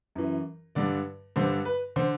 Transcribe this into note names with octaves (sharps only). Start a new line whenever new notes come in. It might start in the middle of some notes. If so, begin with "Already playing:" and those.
F#2 E3
G2 D3 D5
G2 D3 C5
B4
D3 C5